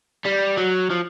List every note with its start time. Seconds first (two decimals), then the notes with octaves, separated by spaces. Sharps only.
0.25 G3
0.58 F#3
0.91 F3